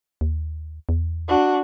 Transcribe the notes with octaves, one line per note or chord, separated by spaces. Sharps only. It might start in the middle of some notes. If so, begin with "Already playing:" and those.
D#2
E2
D4 F#4